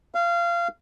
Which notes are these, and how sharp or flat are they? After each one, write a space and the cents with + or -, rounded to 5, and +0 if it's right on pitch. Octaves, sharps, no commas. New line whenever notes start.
F5 -25